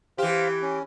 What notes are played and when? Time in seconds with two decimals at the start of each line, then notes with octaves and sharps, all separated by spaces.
0.18 E3 G4 C5 F5
0.62 C#4